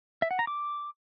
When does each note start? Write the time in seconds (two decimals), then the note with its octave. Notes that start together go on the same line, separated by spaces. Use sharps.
0.22 E5
0.31 F#5
0.39 A#5
0.47 D6